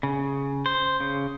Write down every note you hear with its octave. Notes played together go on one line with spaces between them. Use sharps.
C#3
C5
C#3